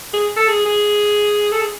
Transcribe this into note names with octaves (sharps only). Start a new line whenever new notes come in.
G#4
A4
G#4
G#4
A4
G#4